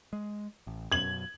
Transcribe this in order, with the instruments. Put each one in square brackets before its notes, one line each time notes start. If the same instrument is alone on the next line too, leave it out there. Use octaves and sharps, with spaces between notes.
[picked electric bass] G#3
A1
[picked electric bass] F#2 B2 F#3 [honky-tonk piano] G#6 F#7